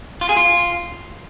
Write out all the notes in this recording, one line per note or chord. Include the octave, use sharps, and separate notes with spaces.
F4
G#4
F4